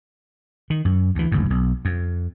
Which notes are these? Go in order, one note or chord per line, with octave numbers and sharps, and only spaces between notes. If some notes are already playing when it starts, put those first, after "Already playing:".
D#3
F#2
D2 E3
F#1 D2 G#2
B1
F2